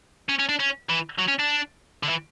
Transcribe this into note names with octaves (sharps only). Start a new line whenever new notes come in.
C#4
C#4
D4
C#4
E3
F#3
C#4
D4
D3
E3